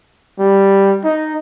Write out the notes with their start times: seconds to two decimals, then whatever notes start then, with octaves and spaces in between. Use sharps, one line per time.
0.39 G3
1.04 D#4